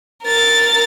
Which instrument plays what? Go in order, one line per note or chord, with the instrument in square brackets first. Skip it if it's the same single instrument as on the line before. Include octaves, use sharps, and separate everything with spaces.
[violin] A#4 A6